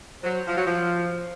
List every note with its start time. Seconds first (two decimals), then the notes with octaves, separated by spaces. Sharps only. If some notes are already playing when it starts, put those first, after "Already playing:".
0.23 F#3 C5
0.47 F3
0.56 F#3
0.67 F3